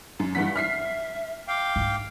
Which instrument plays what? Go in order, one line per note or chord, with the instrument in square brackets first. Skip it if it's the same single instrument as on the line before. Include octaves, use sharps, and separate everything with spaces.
[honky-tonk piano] F#2
[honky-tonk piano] G2 E3 B6 [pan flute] F#5
[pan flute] E5 [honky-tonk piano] F6 B6 C7
[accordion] F5 G5 [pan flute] D6
[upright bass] G#2 D4